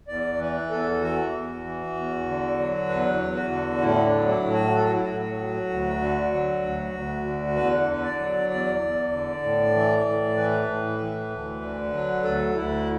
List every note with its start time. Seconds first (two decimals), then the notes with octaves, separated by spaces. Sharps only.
0.08 E2 D5
0.39 E3 B4
0.70 E2 A4
1.01 E3 F#4
1.33 E2
1.64 E3
1.95 E2
2.26 D3
2.58 F#3
2.89 E2 B4
3.20 E2
3.35 F#4
3.51 D3
3.82 A2 E4
4.06 D4
4.13 F#3
4.28 E4
4.44 A2
4.53 F#4
4.75 F#3 A4
4.84 F#4
4.94 E4
5.03 A2 F#4
5.38 F#3
5.69 D2
6.00 D3
6.31 F#3
6.63 D2
6.93 D2
7.25 D3
7.56 E2 B4
7.88 D3
8.03 D5
8.19 F#3
8.49 E2 D5
8.81 E2
9.12 D3
9.43 A2
9.74 E3
10.06 A2
10.36 E3 B4
10.68 A2
10.99 E3
11.30 D2
11.62 D3
11.93 F#3
12.23 D2 A4
12.55 D2 E4